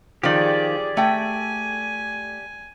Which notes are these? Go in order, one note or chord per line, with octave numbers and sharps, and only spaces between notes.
D#3 F3 G4 G#4 D5
A3 G5 G#5